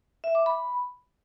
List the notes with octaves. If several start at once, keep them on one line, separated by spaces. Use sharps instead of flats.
E5
D6
B5